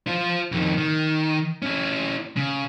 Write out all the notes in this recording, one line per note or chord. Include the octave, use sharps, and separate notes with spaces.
F4 C5
F2 D#3
D#3
C#4 E4
C#3